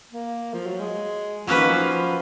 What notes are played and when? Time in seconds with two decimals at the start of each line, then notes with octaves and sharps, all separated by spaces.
0.13 A#3
0.54 F3
0.66 F#3
0.80 G#3
1.47 F3 F#3 A#3 C#4 F#4 B4
1.57 D#3
1.68 F3